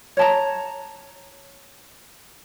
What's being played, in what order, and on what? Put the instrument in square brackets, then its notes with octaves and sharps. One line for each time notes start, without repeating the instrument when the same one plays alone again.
[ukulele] C#5 A5 A#5